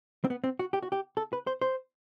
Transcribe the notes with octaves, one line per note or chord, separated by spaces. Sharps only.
C4
B3
C4
F#4
G4
F#4
G4
A4
B4
C5
C5